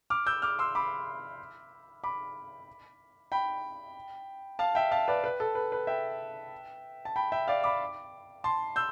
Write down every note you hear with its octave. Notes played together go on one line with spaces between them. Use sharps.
D6 F6
E6 G6
D6 F6
C6 E6
B5 D6
B5 D6
G5 B5
F5 A5
E5 G5
F5 A5
B4 D5
B4
A4
B4
B4
E5 G5
A5
G5 B5
E5 G5
D5 F5
B5 D6
A5 C6
E6 G6